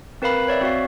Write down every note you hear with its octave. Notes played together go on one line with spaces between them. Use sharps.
C4 A#4 B4 F5 B5
C#5 D5 E5
C4 F#4 F5